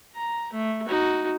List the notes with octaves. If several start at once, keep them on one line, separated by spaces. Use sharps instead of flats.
A#5
A3
D#4 F#4